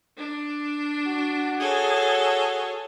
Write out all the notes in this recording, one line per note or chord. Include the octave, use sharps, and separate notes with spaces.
D4
F#4
G#4 A4 C#5